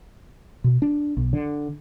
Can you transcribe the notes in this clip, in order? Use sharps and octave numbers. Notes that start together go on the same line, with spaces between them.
B2
D4
B1
D3